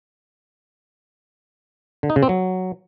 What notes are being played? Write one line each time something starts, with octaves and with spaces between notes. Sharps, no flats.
D3
D#4
C#3
C4
F#3